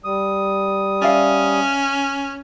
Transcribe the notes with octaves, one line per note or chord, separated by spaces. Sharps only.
G3 D#6
C#4 D5 E5 F5